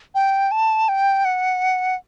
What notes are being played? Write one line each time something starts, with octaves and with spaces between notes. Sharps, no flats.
G5
A5
G5
F#5